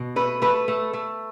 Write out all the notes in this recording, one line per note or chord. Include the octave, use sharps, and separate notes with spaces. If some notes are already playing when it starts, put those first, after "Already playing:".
Already playing: B2
A3 B4
A3 B4
A3
A3